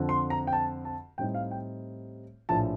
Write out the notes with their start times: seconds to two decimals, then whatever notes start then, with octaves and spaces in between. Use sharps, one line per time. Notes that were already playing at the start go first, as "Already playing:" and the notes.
Already playing: F2 D3 F3 C4
0.09 C6
0.30 A#5
0.47 G5
0.53 A5
0.85 A5
1.18 A2 G3 C4 D#4 G5
1.35 F5
1.51 G5
2.49 A#1 A2 F3 A5